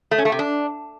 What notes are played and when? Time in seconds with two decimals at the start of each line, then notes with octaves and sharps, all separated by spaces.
0.11 A3
0.18 C#4
0.25 A3
0.32 C3
0.39 D4